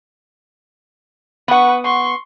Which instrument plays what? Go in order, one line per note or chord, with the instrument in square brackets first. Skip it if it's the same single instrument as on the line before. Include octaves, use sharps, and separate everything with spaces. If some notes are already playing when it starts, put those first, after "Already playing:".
[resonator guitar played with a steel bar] B3 F#5 [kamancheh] B4 C#6
[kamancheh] C6 C#6